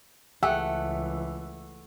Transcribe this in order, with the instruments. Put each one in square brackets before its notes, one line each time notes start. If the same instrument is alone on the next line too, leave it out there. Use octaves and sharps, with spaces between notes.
[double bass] C#2 E3 [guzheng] A3 [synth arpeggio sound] G4 G#4 E5 [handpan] F#5